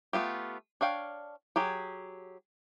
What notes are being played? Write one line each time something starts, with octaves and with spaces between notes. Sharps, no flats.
A3 B3 F4 G4
D4 C#5 F5 G5
F#3 G4 G#4